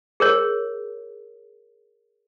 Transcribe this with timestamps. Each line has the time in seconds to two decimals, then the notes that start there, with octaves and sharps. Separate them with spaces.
0.20 G#4 A#4 C#5